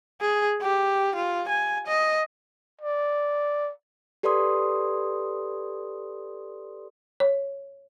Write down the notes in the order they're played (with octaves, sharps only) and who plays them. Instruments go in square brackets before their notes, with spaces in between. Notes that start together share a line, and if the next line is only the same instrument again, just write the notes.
[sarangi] G#4
G4
F4
G#5
D#5
[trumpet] D5
[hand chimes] G4 A4 B4 D5 C6 D#6
[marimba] C#5